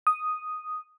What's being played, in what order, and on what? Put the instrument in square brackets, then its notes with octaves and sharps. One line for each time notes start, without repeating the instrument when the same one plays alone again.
[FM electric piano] D#6